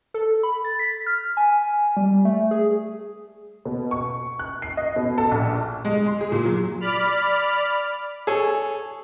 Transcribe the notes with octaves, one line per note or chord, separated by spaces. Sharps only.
A4
B5
A6
B6
F6
G#5
G3
A3
G#4
B2
C#6
F#6
C7
D#5
B2
A4
A#1
G#3
C6
G#4
A#2
F#3
D5 B5 F6
G#4 A4 C#5 G#5